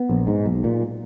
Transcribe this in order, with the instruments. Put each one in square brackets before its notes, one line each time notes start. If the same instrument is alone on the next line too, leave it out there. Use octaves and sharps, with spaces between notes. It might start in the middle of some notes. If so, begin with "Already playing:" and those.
Already playing: [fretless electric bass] B3
A#1
G#2
B1
A#2